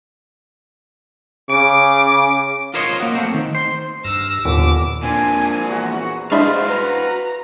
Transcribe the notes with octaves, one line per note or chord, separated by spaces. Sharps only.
C#3 D6 D7
F4 A#4 C5 C#5 D#5
A#3 F#4
A3 C4
D#3
C5
G2 E6 F6 A#6
D#2 A#2 D3 B3 D6
A#2 C4 D4 G#5
E2 F#4
G2 G#3 D4 E4 F#4 C5 F5
B4 A#5